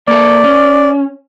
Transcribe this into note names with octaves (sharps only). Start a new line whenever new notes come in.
A#3 A4 D5
C#4